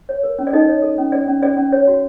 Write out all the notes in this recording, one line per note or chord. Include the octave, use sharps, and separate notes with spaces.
C#5
A#4
C#4
D5
D#4 A4 D#5
C#5
A4
C#4
C#4 D5
C#4
C#4 D5
C#4
C#5
F#4